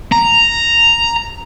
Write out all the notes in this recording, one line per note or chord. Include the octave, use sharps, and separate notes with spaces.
A#5